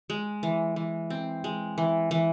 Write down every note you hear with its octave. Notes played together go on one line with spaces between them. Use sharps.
G#3
E3
E3
C4
G#3
E3
E3